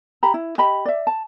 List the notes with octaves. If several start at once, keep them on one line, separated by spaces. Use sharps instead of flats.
G4 A#5 B5
E4
G4 D#5 B5
D5 E5
A5